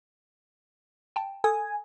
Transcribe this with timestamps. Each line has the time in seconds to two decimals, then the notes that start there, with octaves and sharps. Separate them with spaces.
1.16 G5 A5
1.44 A4 G#5 D#6